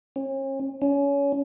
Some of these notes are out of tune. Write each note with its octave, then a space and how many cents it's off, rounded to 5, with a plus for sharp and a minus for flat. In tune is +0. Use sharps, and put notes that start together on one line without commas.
C#4 -40
C#4 +25